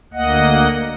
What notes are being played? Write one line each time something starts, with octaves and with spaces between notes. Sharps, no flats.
D2 A#3 D#5 F#5